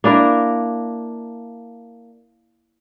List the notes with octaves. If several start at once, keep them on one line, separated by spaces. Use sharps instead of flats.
A#3 D4 E4 A#4